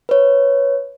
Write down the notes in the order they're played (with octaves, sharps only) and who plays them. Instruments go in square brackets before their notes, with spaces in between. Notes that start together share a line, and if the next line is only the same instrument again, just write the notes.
[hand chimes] B4 C#5